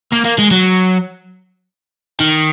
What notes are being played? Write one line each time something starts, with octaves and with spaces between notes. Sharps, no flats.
A#3
A#3
G#3
F#3
D#3